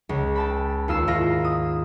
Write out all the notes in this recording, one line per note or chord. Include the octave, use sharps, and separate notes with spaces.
C#2
G5 A5 B5
D#2 F4 E6 C7 E7
D#2 G#2 E4 F4 A#6
D#6